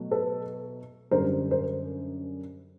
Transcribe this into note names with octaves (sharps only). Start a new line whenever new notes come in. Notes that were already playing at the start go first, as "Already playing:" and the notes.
Already playing: B2 F#3 A3
A4 B4
F#2 D3 G3 A#4 C5
A#4 C5